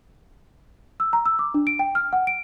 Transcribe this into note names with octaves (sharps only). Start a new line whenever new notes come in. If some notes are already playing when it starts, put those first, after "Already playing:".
E6
A#5
E6
D6
D4
D7
G5
F6
F#5
D7